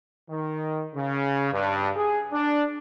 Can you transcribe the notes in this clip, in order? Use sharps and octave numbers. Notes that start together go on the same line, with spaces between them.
D#3
C#3
G2
G#4
D4